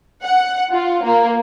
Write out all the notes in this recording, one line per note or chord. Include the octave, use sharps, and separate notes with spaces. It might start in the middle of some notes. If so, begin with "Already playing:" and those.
F#5
F4
A#3